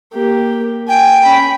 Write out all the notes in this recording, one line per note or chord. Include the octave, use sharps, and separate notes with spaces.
A#3 G4
G5 G#5
C#4 B5